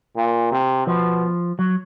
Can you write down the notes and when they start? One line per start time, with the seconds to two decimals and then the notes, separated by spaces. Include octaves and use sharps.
0.16 A#2
0.51 C3
0.86 B2 F3
1.59 F#3